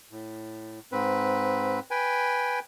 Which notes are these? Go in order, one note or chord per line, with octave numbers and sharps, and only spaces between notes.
A2
G#2 C4 B4
B4 G5 G#5